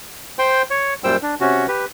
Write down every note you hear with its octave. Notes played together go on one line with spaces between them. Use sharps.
C5 G5 C6
C#5
F#2 A#2 G3 C5 G5 E6
D4
C3 C#4 F#4
G4 B4